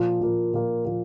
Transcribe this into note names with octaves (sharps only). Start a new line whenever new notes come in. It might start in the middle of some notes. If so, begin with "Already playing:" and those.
Already playing: A#2 F3 A#3
A#2 F3 A#3
A#2 F3 A#3
A#2 F3 A#3